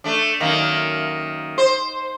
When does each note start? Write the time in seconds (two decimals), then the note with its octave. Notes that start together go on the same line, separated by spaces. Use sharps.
0.04 A3 D4
0.40 F#2 D#3 A#3
1.58 C5